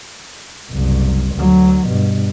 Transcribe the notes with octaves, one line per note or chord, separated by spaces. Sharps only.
F#1 C2
D2 F#3
G2 B2